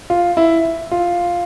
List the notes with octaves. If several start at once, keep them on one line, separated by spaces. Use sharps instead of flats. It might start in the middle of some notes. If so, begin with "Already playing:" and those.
F4
E4
F4